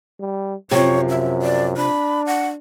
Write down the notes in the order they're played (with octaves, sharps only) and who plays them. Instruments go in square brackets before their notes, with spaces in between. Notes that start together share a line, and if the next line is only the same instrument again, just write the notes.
[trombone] G3
[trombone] F#2 [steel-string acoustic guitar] C3 F3 [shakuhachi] C#5
[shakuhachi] E5
D5
[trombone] D4 [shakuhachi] B5
[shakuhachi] F#5